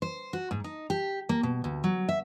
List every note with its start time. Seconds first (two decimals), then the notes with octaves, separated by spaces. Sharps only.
0.02 C5
0.33 F#4
0.51 G#2
0.64 D#4
0.90 G4
1.29 A#3
1.43 B2
1.64 D2
1.84 F#3
2.09 E5